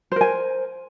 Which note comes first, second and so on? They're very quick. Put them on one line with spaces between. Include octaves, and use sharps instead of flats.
C5 A#4 G#5